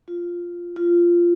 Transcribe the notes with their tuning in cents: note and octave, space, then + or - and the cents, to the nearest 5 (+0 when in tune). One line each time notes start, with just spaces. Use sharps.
F4 +0
F4 -10